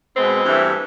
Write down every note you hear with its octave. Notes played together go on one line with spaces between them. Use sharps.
B2 G#3 B3 C4
G2 E3 A3